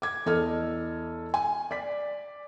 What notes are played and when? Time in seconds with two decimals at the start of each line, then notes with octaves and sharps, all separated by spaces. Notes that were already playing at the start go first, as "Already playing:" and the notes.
0.02 D6 G#6
0.26 E2 A4 D#5 F6
1.34 G#5
1.71 D5 B6